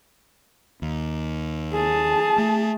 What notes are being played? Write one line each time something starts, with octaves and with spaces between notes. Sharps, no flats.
D#2
G#4 A5
A3